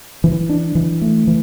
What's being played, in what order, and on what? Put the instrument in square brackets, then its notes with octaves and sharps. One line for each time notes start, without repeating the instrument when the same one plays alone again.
[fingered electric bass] E3
D4
E3
A3
E3